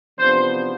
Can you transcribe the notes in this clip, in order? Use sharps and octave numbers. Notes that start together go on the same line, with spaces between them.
E2 C3 F3 B3 D4 C5